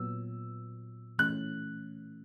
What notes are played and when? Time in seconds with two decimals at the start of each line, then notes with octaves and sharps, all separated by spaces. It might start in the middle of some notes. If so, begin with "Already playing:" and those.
Already playing: A#2 F#3 B3 E6
1.18 E3 A3 C#4 F#6